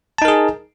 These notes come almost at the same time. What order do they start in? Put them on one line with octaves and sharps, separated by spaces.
A5 D#4 A#4 G#4